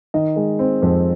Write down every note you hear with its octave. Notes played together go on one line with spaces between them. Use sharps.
D#3 D#5
G#3
C4
F2